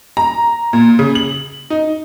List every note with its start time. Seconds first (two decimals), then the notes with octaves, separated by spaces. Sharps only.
0.17 A#5
0.73 A#2
0.99 C#3
1.15 F#7
1.70 D#4